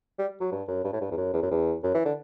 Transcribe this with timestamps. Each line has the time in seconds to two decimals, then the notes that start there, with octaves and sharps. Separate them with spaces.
0.19 G3
0.41 F#3
0.52 G2
0.68 F#2
0.85 G2
0.93 A2
1.01 G2
1.11 E2
1.17 F#2
1.34 E2
1.43 F#2
1.51 E2
1.83 F#2
1.94 E3
2.05 D3